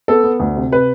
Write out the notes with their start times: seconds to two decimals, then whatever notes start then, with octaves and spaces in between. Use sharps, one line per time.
0.08 B3 A4
0.24 B3
0.40 D2
0.56 C3
0.72 C3 B4